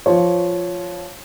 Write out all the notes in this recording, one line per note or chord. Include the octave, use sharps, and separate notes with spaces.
F3 C#5